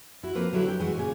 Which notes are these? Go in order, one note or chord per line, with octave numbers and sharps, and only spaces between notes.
E4 F#4
F3 A#3 C4 B4
D3 F#3 E4 F#4 G4
G5
E3 G#3 F#4
A#2 C#3 G#4